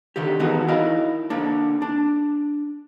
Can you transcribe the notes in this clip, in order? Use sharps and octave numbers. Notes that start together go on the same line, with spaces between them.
D3 D#3 G4
D#3 E3 B3 F#4 G#4
D#4 E4 A#4 D#5 F5
D3 A#3 D4
D4